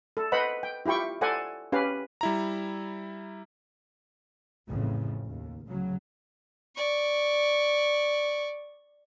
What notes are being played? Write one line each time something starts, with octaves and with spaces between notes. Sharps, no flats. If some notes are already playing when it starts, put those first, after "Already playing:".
A4
B4 C5 D#5 F#5 B5
G5
E4 F4 G4 G5 C#6
A4 C5 D5 F#5 G#5
C#4 G4 B4 F5
G3 E4 A#5
A1 F2 A2 C#3
D#2
D2 C#3 F#3
D5 C#6